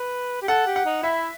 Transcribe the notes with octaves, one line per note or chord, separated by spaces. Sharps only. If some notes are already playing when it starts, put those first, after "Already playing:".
Already playing: B4
G4
A4 F#5
G4
F#5
D#4
E4 E5